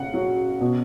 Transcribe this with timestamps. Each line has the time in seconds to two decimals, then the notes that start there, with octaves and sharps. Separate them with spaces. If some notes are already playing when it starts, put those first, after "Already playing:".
Already playing: C#3 F#5
0.14 F#3
0.61 B2